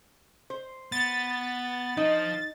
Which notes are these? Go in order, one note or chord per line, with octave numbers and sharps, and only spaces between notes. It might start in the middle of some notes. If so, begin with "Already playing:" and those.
C5
B3 A6
F3 D#4 F4